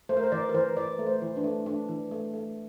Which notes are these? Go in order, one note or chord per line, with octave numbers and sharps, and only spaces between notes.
A3 C5
A#4
C5
E3 D5
A#4
E3 C5
E3 D5
A3
C5
E3
D4
A3
A3 D4
E3
A3
A3